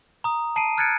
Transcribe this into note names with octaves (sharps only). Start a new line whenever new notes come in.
A#5 D#6
A5 C7 D7 D#7
F6 F#6 G#6 A6 C#7 D7